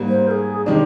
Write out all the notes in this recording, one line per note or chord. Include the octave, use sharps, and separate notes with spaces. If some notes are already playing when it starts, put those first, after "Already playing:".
Already playing: G#2 G3 A#3
C5
A#4
G#4
D#3 G#3 D4 G4